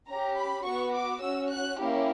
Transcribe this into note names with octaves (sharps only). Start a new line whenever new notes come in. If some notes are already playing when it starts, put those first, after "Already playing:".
C#4 G4 A#5
B5
B3 F#4 C#6
D6
C#4 F#4 E6
F#6
A#3 C#4 E4 G4